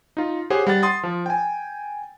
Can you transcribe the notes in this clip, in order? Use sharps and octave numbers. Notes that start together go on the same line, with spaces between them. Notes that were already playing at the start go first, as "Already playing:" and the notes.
D#4 F4
G4 G#4 C5 C#5 F#5
G3 F#5 A6
C6 D#6 A6
F3
G5 G#5